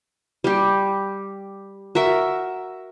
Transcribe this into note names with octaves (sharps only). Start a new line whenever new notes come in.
G3 G4
F#4 A#4 E5